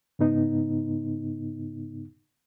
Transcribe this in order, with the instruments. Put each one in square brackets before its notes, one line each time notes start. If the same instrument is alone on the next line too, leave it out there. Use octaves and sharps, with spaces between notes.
[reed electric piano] G#2 C#3 B3 D#4